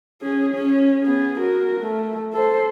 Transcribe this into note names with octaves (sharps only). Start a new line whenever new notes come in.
C#4 G#4
C#4
B3 G#4
F#4 A#4
A3
A4 C5